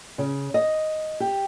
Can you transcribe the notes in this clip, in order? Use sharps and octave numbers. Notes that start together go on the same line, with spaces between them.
C#3
D#5
G4